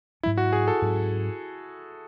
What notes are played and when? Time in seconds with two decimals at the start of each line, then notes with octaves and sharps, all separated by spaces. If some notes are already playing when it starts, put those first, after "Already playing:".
0.23 G#2 F#3 C#4 E4
0.38 F#4
0.53 G#4
0.68 A4
0.82 G#2 F#3 C#4